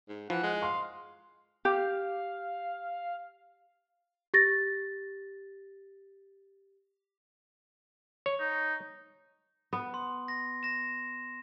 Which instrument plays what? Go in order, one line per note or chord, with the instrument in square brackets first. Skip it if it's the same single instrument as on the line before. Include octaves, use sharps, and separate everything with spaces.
[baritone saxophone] G#2
[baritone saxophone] E3 [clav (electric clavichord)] F3 [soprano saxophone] F#5
[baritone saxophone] G#3
[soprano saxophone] F5 [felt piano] C6
[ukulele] G4 [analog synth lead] F5
[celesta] G4 A6 A#6
[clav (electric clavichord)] C#5
[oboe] D#4
[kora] B3
[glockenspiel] C6
A#6
A#6 E7